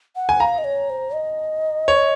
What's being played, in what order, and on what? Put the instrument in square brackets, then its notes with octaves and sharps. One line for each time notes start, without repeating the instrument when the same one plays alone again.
[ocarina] F#5
[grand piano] G#5
[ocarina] F5 [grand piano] A#5
[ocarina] D#5
C#5
C5
D#5
[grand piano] C#5